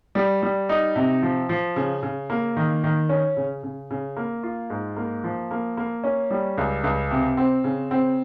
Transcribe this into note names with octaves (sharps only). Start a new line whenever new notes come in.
G3
G3
D#4
C3
F3
F3
C#3
C#3
A#3
D#3
D#3
C#4
C#3
C#3
C#3
A#3
F4
G#2
A#3
F3
A#3
A#3
C#4
G3
C#2
C#2
C3
C4
C#3
C4